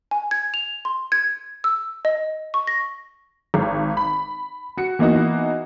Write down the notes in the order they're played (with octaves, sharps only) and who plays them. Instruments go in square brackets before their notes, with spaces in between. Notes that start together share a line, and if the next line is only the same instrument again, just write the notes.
[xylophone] G#5
G#6
F7
C6
G#6
E6
D#5
C#6
A#6
[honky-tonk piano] G#1
B5
F#4 C#7
E3 A#3 B3 D#4 F#4